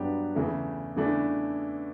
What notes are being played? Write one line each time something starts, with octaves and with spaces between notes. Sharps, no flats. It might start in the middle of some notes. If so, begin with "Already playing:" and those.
Already playing: G2 F#3 B3 D4 G4
E2 C#3 E3 A3
E2 C#3 E3 A3 D4